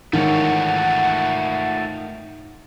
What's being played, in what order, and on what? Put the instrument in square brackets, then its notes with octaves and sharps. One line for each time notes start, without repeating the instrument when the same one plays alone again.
[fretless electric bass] G#2 E3 G#3 [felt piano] D#3 [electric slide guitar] A3 F4 C#5 [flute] F#5